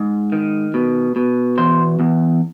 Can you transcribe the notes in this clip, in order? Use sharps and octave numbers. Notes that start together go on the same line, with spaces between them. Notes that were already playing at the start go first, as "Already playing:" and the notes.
Already playing: G#2
D#3
B2
B2
E2 C5
E2